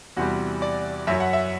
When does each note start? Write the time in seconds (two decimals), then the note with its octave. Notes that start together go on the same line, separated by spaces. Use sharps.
0.17 E2 C3 G3 F#4
0.62 D5
1.07 F#2 F#3 E5
1.20 F#5
1.33 E5